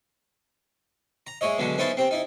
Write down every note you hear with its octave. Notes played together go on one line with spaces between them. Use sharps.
A#5
G#3 E4 C#5 D#5
B2 D3 F#3 G#3
B3 C#4 D#4 E4 C5 A5
C4 G4
D#4 E4